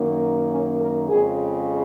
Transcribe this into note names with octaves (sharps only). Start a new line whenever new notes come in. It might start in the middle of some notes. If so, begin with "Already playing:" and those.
Already playing: F#2 D#3 A#3
C#4
A#4
F2 C#3 G#3 G#4